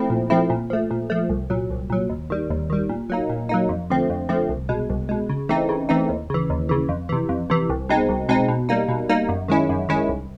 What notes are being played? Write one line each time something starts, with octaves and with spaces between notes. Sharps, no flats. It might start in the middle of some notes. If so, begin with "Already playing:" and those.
Already playing: F3 A3 C4 E4
A#2
F3 A3 C4 E4
A#2
F3 A3
A#2
F3 A3
C2
A#2 F#3
C2
A#2 F#3
D#2
D#3 G3
D#2
D#3 G3
A#2
F#3 A#3 D#4
A#2
F#3 A#3 D#4
F2
D3 F3 A3 C4
F2
D3 F3 A3 C4
C2
B2 G#3
C2
B2 G#3
C#3
E3 A3 C4 D#4
C#3
E3 A3 C4 D#4
D#2
C#3 E3
D#2
C#3 E3
F2
C3 E3
F2
C3 E3
C2
B2 G#3 C4 D#4
C2
B2 G#3 C4 D#4
B2
G3 A#3 D#4
B2
G3 A#3 D#4
F#2
D#3 G#3 C#4 E4
F#2
D#3 G#3 C#4 E4
C2